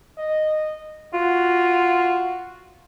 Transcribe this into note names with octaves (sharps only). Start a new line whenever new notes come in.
D#5
F4 F#4